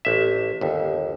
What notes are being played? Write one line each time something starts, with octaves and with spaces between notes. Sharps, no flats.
A1 E5
G1 D#2